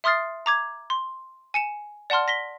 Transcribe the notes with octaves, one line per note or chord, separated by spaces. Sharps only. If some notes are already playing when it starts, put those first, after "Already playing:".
E5 C6 D#6 F6 A6 C7
A#5 D6 G#6
C6
G#5 C#7 E7
D5 F#5 A5 C6 F6
A#6 B6 G7